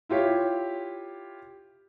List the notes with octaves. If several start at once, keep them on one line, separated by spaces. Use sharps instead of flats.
E4 F4 G4 C#5